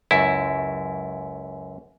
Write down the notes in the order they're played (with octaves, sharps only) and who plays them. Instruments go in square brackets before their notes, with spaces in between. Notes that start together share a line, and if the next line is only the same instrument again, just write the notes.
[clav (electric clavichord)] C#2 F#2 E4